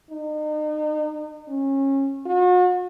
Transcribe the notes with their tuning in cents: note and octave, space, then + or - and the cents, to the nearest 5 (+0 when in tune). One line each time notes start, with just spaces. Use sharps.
D#4 -40
C#4 -25
F#4 -40